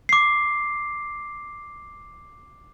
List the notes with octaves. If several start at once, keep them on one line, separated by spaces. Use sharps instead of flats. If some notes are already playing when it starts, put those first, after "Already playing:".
D6 C7